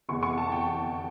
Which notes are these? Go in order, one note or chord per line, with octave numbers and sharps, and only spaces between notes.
F1 E2 E3 C#6
C#6
A5
G5